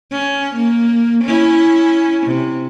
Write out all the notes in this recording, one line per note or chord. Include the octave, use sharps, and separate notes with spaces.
C#4
A#3
C#4 E4
C3